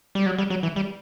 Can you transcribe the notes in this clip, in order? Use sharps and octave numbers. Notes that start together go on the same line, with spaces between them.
G3
F#3
G3
F#3
E3
G3